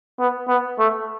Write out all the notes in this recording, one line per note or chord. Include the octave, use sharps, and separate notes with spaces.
B3
B3
A3